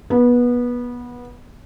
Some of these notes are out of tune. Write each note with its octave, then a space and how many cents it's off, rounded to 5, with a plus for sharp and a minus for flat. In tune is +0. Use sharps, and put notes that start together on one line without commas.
B3 -20